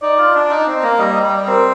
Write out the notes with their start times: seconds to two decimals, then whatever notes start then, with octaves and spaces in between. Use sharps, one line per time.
0.02 D#4 D5
0.18 F4
0.35 D4
0.50 D#4
0.67 C4
0.83 A#3
0.98 G3 D#5
1.15 D#5
1.23 G3
1.31 D5
1.47 C4 A#4